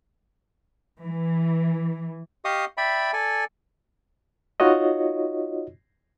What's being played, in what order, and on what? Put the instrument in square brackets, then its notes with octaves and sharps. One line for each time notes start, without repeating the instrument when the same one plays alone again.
[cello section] E3
[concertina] G4 D#5 F5 C#6 D#6
D5 E5 G5 B5
A4 D5 G#5
[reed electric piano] D#4 F4 F#4 C#5 D#5